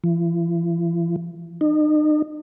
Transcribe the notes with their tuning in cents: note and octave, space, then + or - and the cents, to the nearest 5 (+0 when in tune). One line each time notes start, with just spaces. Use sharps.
E3 +45
D#4 -40